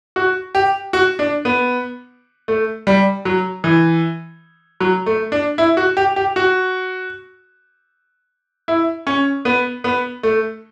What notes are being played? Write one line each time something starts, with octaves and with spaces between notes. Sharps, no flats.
F#4
G4
F#4
D4
B3
A3
G3
F#3
E3
F#3
A3
D4
E4
F#4
G4
G4
F#4
E4
C#4
B3
B3
A3